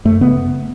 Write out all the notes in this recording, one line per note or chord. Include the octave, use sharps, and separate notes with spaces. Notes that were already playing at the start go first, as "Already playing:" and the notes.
F#2 A3
C#3 B3